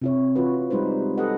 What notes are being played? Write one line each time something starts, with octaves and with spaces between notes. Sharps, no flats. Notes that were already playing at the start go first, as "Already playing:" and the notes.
C3 E4 C#5
E3 F4 F#4 B4
G3 G#3 D#4 B4 C5
G4 A4 B4 D#5 F#5